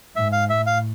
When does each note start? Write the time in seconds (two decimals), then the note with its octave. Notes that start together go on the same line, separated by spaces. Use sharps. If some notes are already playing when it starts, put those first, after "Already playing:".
0.16 G#2 E5
0.33 F5
0.49 A2 E5
0.67 F5